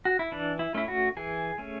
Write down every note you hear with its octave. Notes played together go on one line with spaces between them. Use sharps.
F#4
E4
E3 D4
E4
A3 C#4 E4
F#4
E3 G#4
A3 C#4